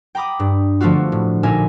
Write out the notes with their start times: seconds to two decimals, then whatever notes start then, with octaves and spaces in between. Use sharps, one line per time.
0.15 G5 A#5 B5 D6 D#6
0.39 G2
0.80 D3 F3 A3 B3 F4 F#4
1.12 A2
1.43 A#1 A#2 D#4 A#4 E5 G#5